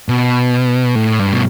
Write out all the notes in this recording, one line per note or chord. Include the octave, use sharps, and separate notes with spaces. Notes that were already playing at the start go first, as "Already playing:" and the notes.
B2
A2
G2
B2